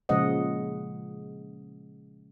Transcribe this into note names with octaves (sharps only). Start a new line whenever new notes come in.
A#2 C#3 F3 G#3 D#5 F#5